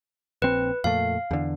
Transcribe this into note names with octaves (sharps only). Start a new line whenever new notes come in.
A#1 C4 B4
F2 A#2 A3 F5
E2 D3